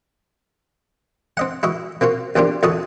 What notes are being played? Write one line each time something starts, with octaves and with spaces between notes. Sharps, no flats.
C4 D#5 F#5
E4 F#4 D#5
A#3 C4 F4 F#4
B1 A#3 C4 D4 F4 G4
F2 E3 F#4 D#5 A5 D#6